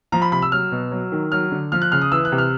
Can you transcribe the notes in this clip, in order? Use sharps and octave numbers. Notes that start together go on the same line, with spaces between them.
F3 A#5
B5
C3 B5
E6
F#3 F6
B2
F#3
D#3
F#3 F6
D3
F3 F6
F#6
C#3 F6
D#6
E3 E6
F#6
C3
F6